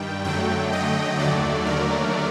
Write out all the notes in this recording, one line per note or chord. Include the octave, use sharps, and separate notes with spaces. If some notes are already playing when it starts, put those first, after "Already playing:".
Already playing: G2 D#3 G3 G5
F#2 D3 F#3 A3 G5
D#5
D#2 D3 F#3 A3 D5
A#4